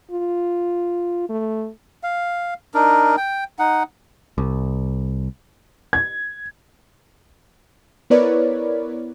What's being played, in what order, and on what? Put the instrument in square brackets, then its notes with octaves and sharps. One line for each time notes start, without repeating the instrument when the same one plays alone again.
[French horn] F4
A3
[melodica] F5
D4 D#4 A#4
G5
D#4 F#5
[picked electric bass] C2
[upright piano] G#6
[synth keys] B3 E4 A#4 B4 C#5 D5